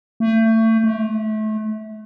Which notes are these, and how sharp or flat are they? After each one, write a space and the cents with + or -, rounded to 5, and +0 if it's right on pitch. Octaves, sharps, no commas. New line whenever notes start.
A3 +30
A3 -30